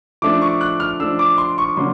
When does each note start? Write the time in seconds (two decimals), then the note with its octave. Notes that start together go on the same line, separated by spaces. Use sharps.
0.22 F3 A3 D4 D6
0.42 C#6
0.61 F#6
0.80 F6
1.00 F3 A3 D4 E6
1.19 D6
1.38 C6
1.58 C#6
1.77 C#3 F#3 A#3 D4 C6